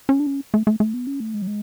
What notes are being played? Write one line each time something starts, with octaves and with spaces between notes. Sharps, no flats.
C#4
D4
C#4
A3
A3
A3
B3
C#4
A3
G#3
F#3
G#3